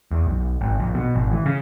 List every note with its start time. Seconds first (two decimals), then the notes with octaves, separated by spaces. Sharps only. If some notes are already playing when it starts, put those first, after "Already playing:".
0.12 E2
0.27 B1
0.61 G#1
0.80 A#1
0.95 B2
1.15 G#1
1.31 E3
1.46 C#3